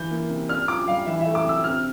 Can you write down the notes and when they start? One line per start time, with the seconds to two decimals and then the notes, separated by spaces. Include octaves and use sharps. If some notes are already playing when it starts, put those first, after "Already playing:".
Already playing: E3 G6
0.11 A#3
0.30 C3
0.49 D4 F6
0.68 F4 D6
0.87 G3 F5
1.06 E3 E5
1.21 E5
1.26 A3
1.35 D6
1.45 C3 E6
1.64 C4 F6